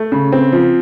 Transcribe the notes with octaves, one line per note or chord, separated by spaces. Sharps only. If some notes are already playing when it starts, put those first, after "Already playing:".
Already playing: A3
C#3
C4
F3